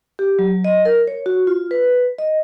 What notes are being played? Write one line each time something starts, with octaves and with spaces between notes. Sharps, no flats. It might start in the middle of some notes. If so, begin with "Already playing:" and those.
G4
F#3
D#5
A#4
C#5
F#4
F4
B4
D#5